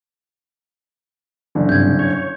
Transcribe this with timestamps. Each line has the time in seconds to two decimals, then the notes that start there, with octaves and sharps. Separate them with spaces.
1.55 F#1 D3
1.69 G2 C3 G6 G#6
1.99 C#5